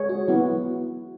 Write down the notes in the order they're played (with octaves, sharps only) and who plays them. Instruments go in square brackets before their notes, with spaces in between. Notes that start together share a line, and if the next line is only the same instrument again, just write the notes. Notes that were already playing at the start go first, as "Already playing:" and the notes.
Already playing: [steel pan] G#3 G#4 C#5
[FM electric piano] F#4
[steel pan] F#3 B3 F#4 B4 [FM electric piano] E4